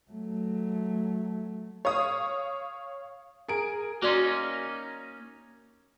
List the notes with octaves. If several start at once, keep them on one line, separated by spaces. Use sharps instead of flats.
F#3 A3
C#5 F5 D#6
G#4 A#4 D7
A#3 C#4 D#4 F#4 D5 C6